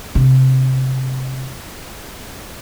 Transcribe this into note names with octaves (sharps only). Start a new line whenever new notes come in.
C3